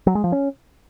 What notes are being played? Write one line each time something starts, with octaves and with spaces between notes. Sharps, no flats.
F#3
G#3
F3
C#4